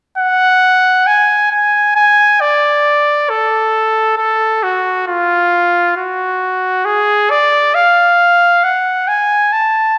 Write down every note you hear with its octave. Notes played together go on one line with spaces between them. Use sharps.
F#5
G#5
G#5
G#5
D5
A4
A4
F#4
F4
F#4
G#4
D5
F5
F#5
G#5
A5